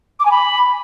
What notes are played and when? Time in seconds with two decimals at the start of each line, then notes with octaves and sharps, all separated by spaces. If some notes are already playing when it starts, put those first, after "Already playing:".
0.20 D6
0.25 G#5
0.31 B5